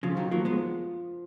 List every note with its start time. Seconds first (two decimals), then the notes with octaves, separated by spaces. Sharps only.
0.03 C#3 F3 F4
0.17 D#3 F#3
0.31 F3 F#3 A#3
0.45 G#3 B3